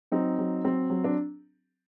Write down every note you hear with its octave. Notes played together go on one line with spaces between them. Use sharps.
F#3 C4 D#4
F#3
F#3 C4
F#3
D4